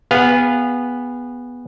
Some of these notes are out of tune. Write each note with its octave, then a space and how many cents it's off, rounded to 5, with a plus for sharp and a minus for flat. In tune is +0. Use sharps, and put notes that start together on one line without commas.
B3 -5 G#4 -25 F5 +0